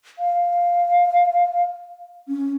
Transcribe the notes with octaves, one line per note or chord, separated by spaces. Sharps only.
F5
C#4